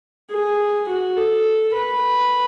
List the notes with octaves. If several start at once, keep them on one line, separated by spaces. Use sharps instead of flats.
G#4
F#4
A4
B4